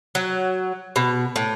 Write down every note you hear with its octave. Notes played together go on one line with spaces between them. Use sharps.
F#3
B2
A2